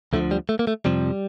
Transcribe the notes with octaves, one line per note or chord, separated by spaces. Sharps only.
D2 D3 F3 A3
G3
A3
A#3
A3
F2 C3 F3 G3